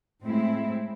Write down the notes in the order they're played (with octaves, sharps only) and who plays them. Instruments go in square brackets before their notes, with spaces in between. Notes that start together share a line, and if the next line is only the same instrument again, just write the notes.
[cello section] A2 G#3 C4 E4